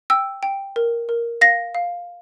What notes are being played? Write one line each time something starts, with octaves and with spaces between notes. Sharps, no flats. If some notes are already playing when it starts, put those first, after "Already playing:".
G5 E6
G5
A#4
A#4
F5 A#6
F5